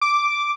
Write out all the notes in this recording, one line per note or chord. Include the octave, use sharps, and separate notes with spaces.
D6